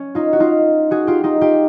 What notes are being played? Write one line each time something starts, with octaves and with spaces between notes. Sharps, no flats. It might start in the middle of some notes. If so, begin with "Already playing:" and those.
Already playing: C#4
D#4 F4
F#4
D#4 F4
F#4 G#4
F4 G4
D#4 F4
F4 G4